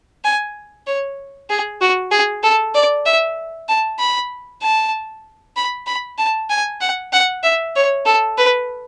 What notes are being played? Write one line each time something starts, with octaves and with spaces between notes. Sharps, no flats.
G#5
C#5
G#4
F#4
G#4
A4
D5
E5
A5
B5
A5
B5
B5
A5
G#5
F#5
F#5
E5
C#5
A4
B4